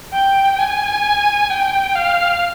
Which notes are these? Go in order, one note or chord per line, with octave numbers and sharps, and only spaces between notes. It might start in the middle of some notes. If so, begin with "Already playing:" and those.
G5
G#5
G5
F5